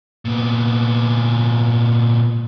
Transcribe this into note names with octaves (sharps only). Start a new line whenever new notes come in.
A#2 B3